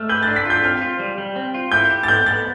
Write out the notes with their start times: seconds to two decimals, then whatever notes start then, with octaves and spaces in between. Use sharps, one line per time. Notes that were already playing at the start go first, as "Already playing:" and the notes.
Already playing: A3 E6 F6
0.09 B4 G6
0.23 D4 A6
0.36 B6
0.45 F4 G6
0.64 C4 F6
0.81 F4
1.00 G3
1.18 G3
1.36 C4
1.54 F4
1.72 E4 G6
1.90 G4
2.03 A6
2.08 B3 G6
2.26 B3 A6